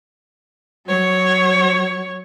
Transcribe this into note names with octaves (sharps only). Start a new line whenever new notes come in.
F#3 C#5